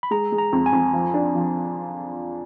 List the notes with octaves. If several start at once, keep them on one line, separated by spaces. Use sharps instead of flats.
B5
G#3 A#5
G#3
A#5
F2
G#5
F2
F3
D4
F3